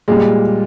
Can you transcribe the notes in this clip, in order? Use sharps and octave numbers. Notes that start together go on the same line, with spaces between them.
A#2 G3 G#3